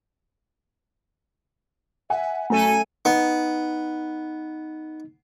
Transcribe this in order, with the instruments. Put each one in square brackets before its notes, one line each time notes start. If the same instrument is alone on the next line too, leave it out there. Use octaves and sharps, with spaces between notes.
[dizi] E5 [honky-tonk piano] F#5 G#5
[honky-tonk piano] F#2 A#5 [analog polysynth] A3 A4 D#7 [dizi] G#5
[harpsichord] B3 [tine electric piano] D#4